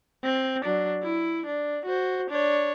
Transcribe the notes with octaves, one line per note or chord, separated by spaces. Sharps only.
C4
F#3 D4
E4
D4
F#4 C5
D4 C#5